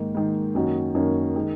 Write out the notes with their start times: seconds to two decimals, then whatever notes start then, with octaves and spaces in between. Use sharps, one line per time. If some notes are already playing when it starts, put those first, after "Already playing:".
Already playing: G#2 D#3 A#3
0.15 G#2 D#3 A#3
0.55 F#2 D#3 A#3 C#4 F#4
0.95 F#2 D#3 A#3 C#4 F#4
1.36 D#3 G#3